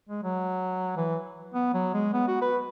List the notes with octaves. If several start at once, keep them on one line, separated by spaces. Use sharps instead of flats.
G#3
F#3
E3
B3
F#3
G#3
B3
F#4
B4